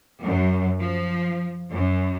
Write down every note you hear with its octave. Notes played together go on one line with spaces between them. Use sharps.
F#2
F3
F#2